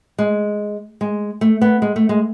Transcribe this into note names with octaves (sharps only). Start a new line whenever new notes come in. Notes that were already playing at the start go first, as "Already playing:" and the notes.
G#3
G#3
A3
B3
G#3
A3
G#3